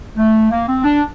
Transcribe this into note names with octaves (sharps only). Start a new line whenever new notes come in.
A3
A#3
C4
D4